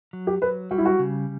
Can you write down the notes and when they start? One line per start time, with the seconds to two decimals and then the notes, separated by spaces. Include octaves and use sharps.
0.13 F#3
0.27 G4
0.42 F#3 B4
0.71 G3 F#4
0.78 E4
0.85 F#4
0.99 C#3